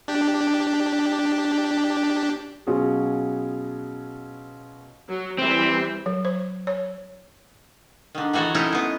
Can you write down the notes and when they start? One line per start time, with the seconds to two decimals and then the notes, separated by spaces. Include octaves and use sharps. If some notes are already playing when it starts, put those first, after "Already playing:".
0.08 D4 G4
2.67 B2 F#3 C#4 F4 F#4 G#4
5.09 F#3
5.38 E3 G3 C4 E5
6.06 F#3
6.25 C5
6.67 C#5
8.15 D3 D#3
8.33 D#3 E3 F#4 A4 C#5
8.54 C4 C#4 D#4 E4 A4 A#4
8.72 G#3 B3